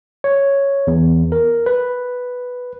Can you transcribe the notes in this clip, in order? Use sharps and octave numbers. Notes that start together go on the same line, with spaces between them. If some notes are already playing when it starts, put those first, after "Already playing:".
C#5
E2
A#4
B4